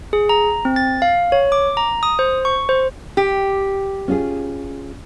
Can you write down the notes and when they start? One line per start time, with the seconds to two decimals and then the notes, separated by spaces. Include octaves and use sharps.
0.13 G#4
0.29 A#5
0.65 C4
0.76 A6
1.02 F5
1.32 C#5
1.52 D6
1.77 A#5
2.03 D#6
2.19 C5
2.45 C#6
2.69 C5
3.17 G4
4.08 C#4 F4 G#4